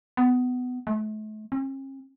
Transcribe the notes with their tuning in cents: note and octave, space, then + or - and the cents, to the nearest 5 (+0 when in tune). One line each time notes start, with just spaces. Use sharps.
B3 +20
A3 -40
C#4 -45